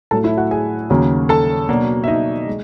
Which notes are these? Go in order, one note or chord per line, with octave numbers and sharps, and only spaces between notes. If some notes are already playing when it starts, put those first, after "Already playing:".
A2 F#3 A3 A4 A5
E4 E5
F#4 F#5
G#4 G#5
D#2 C#3 F#3 A#3
A4 A5
B2 F#3 A#3 D4
E5
D#4 D#5
G#3